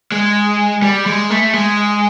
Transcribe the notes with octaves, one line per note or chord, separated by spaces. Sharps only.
G#3
G3
G#3
A3
G#3